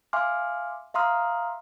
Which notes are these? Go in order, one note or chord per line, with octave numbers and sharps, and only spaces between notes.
E5 F5 G#5 C6 D6 F6
E5 F5 A#5 C6 D#6 F6